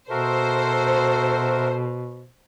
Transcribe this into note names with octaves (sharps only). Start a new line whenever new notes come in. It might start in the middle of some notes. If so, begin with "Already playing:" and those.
B2 F#4 A4 A#4 C5 E5